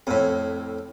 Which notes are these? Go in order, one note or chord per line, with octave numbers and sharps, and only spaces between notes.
F2 A2